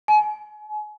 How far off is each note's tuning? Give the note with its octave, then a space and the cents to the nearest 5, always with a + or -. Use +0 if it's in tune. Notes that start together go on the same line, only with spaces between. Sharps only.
G#5 +35